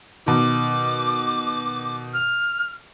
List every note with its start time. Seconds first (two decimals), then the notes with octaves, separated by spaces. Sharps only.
0.26 B2 D#3 D6
2.13 F6